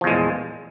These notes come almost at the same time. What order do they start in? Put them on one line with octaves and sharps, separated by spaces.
F3 E2 G#3 A#2